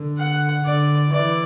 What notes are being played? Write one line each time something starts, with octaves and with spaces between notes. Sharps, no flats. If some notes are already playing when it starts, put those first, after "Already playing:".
Already playing: D3
F#5
D3 D5
E3 D5